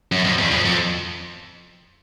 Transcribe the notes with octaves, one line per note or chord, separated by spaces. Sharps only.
F#2
F2
E2
F2
F2